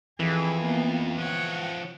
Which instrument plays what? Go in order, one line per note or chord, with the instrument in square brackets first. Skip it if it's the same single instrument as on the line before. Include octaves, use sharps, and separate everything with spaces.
[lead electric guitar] F2 [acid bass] E3 [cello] G#4
[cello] A#3 B3
[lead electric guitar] F3 C#5 [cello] F#5 G5